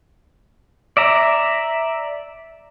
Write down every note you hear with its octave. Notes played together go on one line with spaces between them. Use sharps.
D5 E5 A#5